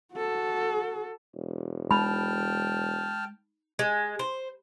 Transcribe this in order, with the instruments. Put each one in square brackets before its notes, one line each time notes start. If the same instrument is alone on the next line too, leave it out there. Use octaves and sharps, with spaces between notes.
[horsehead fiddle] F#4 A4
[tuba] E1
[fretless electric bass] G#3 [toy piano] D#4 B5 [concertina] G5 A5 F6
[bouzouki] G#3
C5